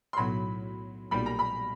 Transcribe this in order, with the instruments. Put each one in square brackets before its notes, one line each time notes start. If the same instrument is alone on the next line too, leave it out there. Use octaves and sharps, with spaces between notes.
[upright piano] C6
[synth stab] B1 A2 F#3 [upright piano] B5
[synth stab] B1 A#2 G3 [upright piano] B5
[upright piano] A#5
B5